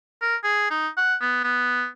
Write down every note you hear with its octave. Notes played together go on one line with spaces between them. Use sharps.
A#4
G#4
D#4
F#5
B3
B3